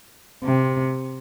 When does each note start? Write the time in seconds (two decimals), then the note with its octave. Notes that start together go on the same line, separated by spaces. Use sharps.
0.44 C3